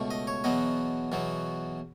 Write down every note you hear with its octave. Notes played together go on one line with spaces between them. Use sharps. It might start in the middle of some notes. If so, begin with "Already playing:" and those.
Already playing: C#2 B2 A3
D#5
C#5
E2 B2 F#3 B3 D#5
E2 B2 F#3 B3